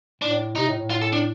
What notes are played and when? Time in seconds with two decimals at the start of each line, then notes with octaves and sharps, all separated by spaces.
0.22 A2 D4
0.55 C3 D#4
0.68 A2
0.79 A2
0.90 F4
1.02 A4
1.13 D4